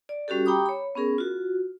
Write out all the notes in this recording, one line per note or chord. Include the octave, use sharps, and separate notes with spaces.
D5
G3 C#4 F#4 G4 A4
G4 G5 A#5 B5 D6 D#6
C#5 B5
B3 C#4 G#4 A#4
F4 F#4